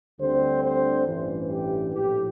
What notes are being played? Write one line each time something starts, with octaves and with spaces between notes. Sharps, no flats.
D2 D3 G3 C4 C5
C5
A1 G2 E3
G4
A#1 A2 F3 G4